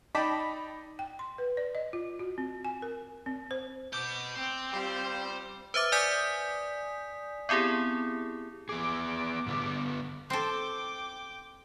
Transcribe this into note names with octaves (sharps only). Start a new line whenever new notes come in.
D#4 D5 G5 A5 B5 D6
G5
C6
B4
D5
D#5
F4
F#4
C4
G#5
A#4
C4
C5
B2 D6 G6
C4 C5 G5
G3 F4 C5
B4 C5 E5 D6
D5 G#5 D#6 G6 B6
B3 C4 E4 G4 G#4
B3 G#4 D6
G2 D3 B3
C4 A4 G5 D6